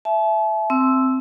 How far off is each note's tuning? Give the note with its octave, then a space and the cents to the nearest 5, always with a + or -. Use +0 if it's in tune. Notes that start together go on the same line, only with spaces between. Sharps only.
E5 +10 A5 -40
C4 +0 E6 +0